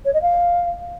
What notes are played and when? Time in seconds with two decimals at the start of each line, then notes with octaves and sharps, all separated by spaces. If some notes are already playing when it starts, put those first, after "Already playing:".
0.05 C#5
0.14 D#5
0.22 F5